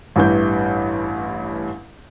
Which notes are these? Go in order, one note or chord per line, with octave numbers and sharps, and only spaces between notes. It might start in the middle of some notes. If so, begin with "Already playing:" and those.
A1 G2 E3 G6